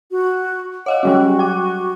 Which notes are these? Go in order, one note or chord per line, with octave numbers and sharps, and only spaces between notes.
F#4
C#5 D#5 F5 F#5
F#3 G3 C#4 F#4
G5 D6